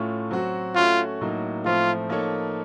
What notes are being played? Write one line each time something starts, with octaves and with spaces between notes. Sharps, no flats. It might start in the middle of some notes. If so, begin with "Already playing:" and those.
Already playing: A2 A3 C#4 F4
F#3 C4 F#4
A3 C#4 F4 F#4
A2 F#3 A#3 D#4
A2 F3 A3 C4 F4
F3 A#3 D#4 A4 C#5